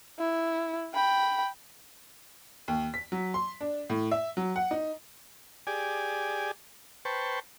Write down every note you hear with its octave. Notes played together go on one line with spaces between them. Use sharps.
E4
G5 B5
D#2
B6
F#3
C6
D4
A2
E5
F#3
F#5
D#4
G4 G#4 D5 G#5
B4 C5 G5 A5 C#6